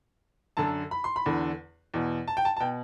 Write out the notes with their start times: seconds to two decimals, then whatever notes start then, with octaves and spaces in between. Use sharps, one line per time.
0.57 F#2 D3 A5
0.91 B5
1.04 C6
1.16 B5
1.26 E2 D3
1.94 E2 B2
2.28 A5
2.37 G5
2.45 A5
2.57 A5
2.60 B2 G5